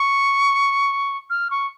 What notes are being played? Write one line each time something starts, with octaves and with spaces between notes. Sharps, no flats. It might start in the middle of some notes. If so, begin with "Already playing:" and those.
Already playing: C#6
F6
C#6